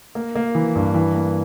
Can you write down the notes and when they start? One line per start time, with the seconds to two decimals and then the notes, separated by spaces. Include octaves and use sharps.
0.15 A#3
0.35 A#3
0.55 E3
0.75 G2
0.94 E3
1.15 A#3